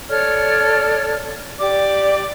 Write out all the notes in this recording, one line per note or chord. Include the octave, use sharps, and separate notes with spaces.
A4 C#5 D5 F6
G4 D5 D6